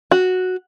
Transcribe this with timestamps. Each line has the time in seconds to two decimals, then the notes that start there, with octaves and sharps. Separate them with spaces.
0.11 F#4